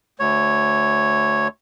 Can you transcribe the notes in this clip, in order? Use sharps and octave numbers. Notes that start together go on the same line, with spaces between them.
D2 C#5